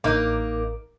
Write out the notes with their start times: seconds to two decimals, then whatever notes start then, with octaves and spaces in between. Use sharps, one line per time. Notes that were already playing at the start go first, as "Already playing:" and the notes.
0.04 A1 A#3 D#4 A#4 D6